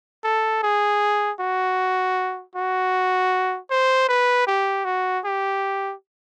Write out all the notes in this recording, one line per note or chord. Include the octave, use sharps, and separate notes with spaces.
A4
G#4
F#4
F#4
C5
B4
G4
F#4
G4